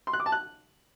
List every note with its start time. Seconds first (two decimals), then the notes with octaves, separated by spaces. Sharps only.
0.07 C6
0.13 F#6
0.20 D6
0.26 A5
0.32 F#6